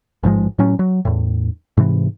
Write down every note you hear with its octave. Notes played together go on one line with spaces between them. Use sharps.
A1 G#2 F3 G#3
A2 F#3 C#4
F#3
E2 A2
G#2 C3 E3